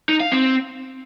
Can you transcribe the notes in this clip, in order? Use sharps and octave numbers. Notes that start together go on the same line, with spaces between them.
D#4
F5
C4